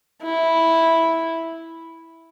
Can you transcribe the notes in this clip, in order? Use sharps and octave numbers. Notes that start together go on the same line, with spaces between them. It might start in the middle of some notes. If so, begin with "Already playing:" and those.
E4